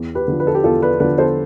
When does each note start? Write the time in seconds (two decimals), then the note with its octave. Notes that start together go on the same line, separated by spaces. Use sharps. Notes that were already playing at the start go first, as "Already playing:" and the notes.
Already playing: E2
0.15 G4 B4
0.28 D3 F3
0.40 B4
0.47 A4
0.54 G4 B4
0.64 E2 F4 A4
0.82 B4 D5
1.00 D3 F3 B4 D5
1.18 A4 C5